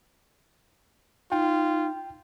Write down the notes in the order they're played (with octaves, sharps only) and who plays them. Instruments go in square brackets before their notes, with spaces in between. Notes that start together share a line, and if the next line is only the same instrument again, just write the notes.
[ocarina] D#4 [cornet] F4 [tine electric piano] G5